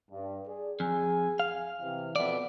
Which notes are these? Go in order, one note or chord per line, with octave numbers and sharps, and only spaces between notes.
G2
G#4 D5
F2 G#4 G#5
F5
C3 E3
F2 B2 B3 D5 E5